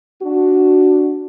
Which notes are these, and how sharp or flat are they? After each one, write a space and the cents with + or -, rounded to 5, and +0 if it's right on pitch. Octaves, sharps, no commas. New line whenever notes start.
D4 +0 F#4 +0